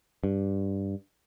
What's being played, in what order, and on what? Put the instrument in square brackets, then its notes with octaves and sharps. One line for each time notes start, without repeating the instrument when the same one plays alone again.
[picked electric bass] G2